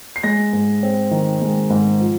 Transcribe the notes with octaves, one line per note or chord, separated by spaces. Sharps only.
C7
G#3 A#6
G#2
C4
D#3
G#3
G#2
F3